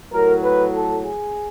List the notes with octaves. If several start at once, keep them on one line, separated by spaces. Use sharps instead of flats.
A2 F#3 A#4
B4
A4
G#4